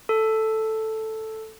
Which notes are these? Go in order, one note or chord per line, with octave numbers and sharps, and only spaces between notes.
A4